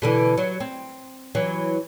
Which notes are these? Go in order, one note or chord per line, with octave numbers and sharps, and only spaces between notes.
B2 D3 E3
F#3
C4
E3 F#3